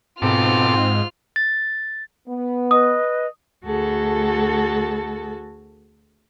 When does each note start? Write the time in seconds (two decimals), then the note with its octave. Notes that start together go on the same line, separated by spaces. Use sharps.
0.22 G#2 B2 C4 F4 A4 D6 F6
1.36 A6
2.27 B3
2.71 B4 D#5 D#6
3.65 D2 F#4 G#4 A4 A5